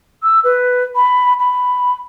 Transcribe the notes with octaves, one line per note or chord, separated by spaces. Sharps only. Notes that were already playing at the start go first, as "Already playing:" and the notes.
E6
B4
B5
B5